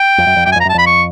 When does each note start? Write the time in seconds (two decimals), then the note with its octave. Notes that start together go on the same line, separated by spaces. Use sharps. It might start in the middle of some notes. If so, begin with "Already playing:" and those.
Already playing: G5
0.18 F2
0.27 F#2
0.36 F2
0.46 F#2 G5
0.52 G#5
0.56 F2
0.61 A#5
0.65 F#2
0.69 A5
0.74 F2 B5
0.87 C#6